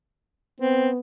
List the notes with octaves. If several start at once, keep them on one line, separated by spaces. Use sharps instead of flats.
B3 C4